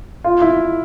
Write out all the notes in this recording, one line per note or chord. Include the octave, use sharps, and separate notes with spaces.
F4
E4